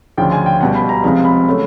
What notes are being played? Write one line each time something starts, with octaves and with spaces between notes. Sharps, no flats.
D2 C#3 F3 G5
G#5
G5
C#2 B2 G3 F#5
B5
A#5
C#2 C3 F3 G#3 B5
B5
C#3 F#3 A3